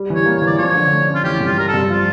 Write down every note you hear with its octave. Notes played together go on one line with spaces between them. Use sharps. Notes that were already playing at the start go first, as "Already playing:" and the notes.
Already playing: G3
E3 C#5
A#3
C#5
E3
D5
F3 C#5
D3
A3
C#4
F4
E3 G4
G2
F4
G3 A#4
A4
G2
F3 F4